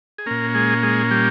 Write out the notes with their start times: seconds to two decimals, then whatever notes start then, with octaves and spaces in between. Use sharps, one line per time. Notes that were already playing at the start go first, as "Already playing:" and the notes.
0.18 G#4
0.26 A#2 A#3 C#4 A#4
0.55 G#3 G#4
0.83 G#3 G#4
1.11 G3 G4